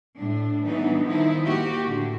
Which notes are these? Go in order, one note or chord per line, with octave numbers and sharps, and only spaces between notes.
A2 D4
E3 F#3 G3 B3 D4 D#4
D#3 F3 D#4 E4
A#3 F#4 G4
A2 D3